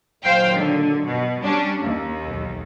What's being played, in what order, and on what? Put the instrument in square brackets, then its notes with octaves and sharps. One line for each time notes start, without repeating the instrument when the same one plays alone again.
[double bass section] A#2 D#3 F#3 [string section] C5 F5 G5
[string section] D3
[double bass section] G2 [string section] B2
[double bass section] G3 [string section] C#4 D4
[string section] D#2 [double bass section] A#3
[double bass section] B1 E2